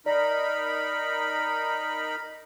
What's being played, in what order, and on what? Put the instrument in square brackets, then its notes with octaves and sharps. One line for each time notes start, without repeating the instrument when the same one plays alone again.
[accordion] D#4 A#4 B5 [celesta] D5